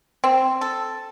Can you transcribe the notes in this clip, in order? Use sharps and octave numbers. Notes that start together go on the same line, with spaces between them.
C4
A4